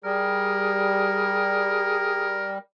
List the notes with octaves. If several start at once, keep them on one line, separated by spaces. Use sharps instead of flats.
G3 G#4 A#4